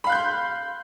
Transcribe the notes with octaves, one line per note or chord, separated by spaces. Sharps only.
F5 B5 C6 F#6 G6